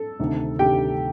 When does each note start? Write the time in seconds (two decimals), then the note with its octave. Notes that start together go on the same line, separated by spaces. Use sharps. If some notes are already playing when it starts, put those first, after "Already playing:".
Already playing: A4
0.19 D2 C3 D#3
0.59 D2 C3 D#3 G4 G5